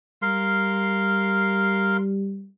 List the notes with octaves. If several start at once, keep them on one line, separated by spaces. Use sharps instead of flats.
G3 A#4 F5 C6